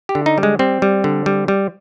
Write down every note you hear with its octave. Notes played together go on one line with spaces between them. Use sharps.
G4
D3
D#4
G3
G#3
G3 C4
G3
D3
G3
G3